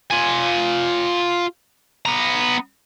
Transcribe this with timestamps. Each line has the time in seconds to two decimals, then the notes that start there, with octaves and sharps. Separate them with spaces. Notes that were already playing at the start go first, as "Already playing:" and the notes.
0.11 F4 G#5
2.06 B3 A#5